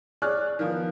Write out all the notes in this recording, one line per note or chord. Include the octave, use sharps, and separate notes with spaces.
G#4 C#5 D5 F6 F#6
D#3 F3 B3